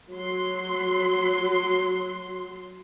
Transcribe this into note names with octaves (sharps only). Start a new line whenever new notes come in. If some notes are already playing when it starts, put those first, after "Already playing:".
F#3 C6